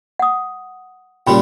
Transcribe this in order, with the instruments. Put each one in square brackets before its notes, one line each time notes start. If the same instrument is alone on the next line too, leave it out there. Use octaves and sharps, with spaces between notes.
[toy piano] F#5 D#6
[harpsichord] A#2 C#3 G3 [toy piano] G5 B5 C6